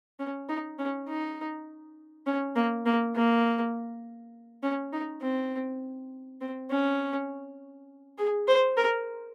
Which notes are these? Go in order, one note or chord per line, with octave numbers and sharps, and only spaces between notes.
C#4
D#4
C#4
D#4
C#4
A#3
A#3
A#3
C#4
D#4
C4
C4
C#4
G#4
C5
A#4